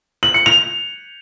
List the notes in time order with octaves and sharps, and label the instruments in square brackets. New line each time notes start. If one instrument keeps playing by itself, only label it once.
[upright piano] F#7
C#7
F7